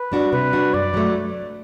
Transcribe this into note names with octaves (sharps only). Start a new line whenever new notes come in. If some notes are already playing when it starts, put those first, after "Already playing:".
Already playing: B4
G3 D4 F#4
C3 B4
G3 D4 F#4
F#2 D5
F#3 A3